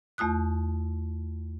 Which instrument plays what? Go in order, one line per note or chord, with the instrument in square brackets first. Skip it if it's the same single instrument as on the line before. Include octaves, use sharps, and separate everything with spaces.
[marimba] E2 A3 F4 D#6 F#6